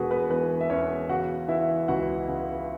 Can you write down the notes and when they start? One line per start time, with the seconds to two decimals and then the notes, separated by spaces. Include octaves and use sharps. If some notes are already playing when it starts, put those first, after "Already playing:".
Already playing: E1 E2 B3 F#4 G#4 B4
0.11 B3 B4
0.30 E3 B3 B4
0.61 E5
0.70 E2 C#4 C#5
1.09 C#3 F#4 F#5
1.48 E3 E4 E5
1.88 C#2 F#4 F#5
2.28 C#3